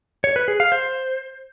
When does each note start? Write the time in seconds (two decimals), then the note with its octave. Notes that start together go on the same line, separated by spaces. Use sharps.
0.24 C#5
0.36 B4
0.48 G#4
0.60 F5
0.72 C5